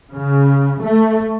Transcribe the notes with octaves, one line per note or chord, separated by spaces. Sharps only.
C#3
A3